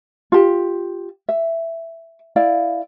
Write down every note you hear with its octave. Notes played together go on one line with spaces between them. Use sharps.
F4 G4
E5
E4 D5 F5